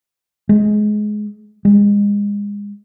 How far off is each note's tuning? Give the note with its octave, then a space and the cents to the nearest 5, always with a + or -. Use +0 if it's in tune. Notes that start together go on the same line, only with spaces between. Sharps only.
G#3 +20
G#3 -30